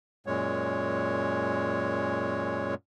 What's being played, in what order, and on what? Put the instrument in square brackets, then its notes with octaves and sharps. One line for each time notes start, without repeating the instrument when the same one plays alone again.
[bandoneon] F#2 A#2 G#3 C#5